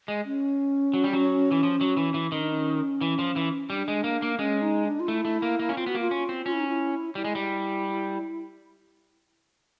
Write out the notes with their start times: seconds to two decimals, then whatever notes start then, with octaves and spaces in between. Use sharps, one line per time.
0.08 G#3
0.25 C#4
0.94 F#3
1.04 G3
1.13 F#3
1.51 E3
1.63 F3
1.81 F#3
1.97 E3
2.14 E3
2.32 D#3 C#4
2.41 D4
2.51 C#4
3.01 E3
3.19 F3
3.36 E3
3.70 G3 D4
3.88 G#3
4.04 A#3
4.22 A#3
4.38 G#3 C#4
4.62 D#4
4.85 D4
5.00 F4
5.08 A3 E4
5.25 A3
5.42 A#3
5.59 A#3
5.69 C#4
5.77 C4 F4
5.86 B3 F#4
5.95 A#3
6.00 F4
6.11 C#4
6.29 C4
6.46 C#4 F4
6.53 E4
6.60 D#4
6.67 E4
7.15 G3 E4
7.24 G#3
7.35 G3